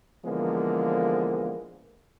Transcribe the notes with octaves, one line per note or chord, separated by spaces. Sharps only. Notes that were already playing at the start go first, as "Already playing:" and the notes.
D3 E3 F3 G#3 A#3 B3